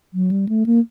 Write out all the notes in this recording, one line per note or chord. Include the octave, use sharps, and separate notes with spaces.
F#3
G3
A3
A#3